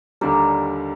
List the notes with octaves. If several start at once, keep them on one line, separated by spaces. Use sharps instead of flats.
D#2 D3 G3 A#4 D5